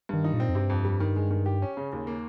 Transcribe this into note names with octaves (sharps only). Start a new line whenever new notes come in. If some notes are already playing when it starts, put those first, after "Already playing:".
G2 D#3
D#4
A#2
C4
F2
G2 C3
F2
G3
D#3
G#3
D#3
G4
C#4
C#3
D#2
A#3